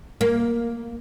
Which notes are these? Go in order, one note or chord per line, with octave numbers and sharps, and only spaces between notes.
A#3